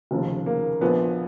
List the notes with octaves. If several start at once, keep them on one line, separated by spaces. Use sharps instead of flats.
F1 D#2 C#3 F3
A#3
A#1 A#2 F3 B3